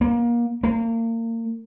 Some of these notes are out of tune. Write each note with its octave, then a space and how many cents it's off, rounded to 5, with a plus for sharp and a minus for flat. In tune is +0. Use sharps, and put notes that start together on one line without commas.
A#3 +25
A#3 -30